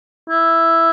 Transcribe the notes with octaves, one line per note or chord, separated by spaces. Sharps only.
E4